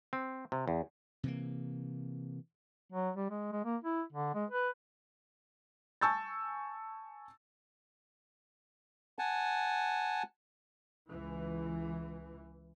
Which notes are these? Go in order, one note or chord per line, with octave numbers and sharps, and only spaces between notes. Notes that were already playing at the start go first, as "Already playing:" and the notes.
C4
C3
E2
C3 E3 A#3
F#3
G3
G#3
G#3
A#3
E4
D3
G#3
B4
G#5 A5 C#6 E6 G6 A6
F#5 G#5 A5
C#2 E3